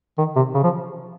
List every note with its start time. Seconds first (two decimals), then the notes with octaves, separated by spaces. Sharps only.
0.18 D#3
0.36 C3
0.54 C#3
0.64 F3